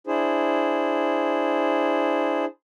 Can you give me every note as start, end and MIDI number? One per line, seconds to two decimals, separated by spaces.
0.07 2.45 62
0.07 2.45 64
0.07 2.45 68
0.07 2.45 72